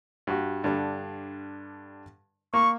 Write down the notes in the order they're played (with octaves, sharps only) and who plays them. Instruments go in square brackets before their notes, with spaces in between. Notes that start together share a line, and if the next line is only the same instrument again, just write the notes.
[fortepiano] G2 F#4
G2 D3 G3
[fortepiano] A#3 [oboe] C#6